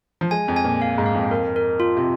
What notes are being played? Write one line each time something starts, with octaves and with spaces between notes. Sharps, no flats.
F3
G#3 G#5
F2
G#5
A#2
F5
G#2
F5
F2
A#4
A#4
F4
C3